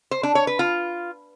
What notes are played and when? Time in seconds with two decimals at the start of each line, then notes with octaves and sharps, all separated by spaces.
0.11 C5
0.23 D4
0.35 C#5
0.47 B4
0.59 F4